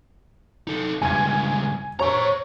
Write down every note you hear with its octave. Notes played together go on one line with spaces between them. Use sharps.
D#4 A4
C#2 G2 G#5 G#6
C5 C#5 A#5 C#6